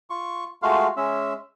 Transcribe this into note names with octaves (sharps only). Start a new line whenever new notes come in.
F4 C#6
G#3 A3 F4 F#4 F5
G#3 C#4 E5